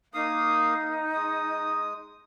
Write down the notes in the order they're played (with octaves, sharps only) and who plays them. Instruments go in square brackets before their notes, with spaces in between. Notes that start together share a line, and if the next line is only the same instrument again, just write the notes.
[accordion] A#3 F5 D#6 [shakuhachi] D#4
[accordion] G#3 D#6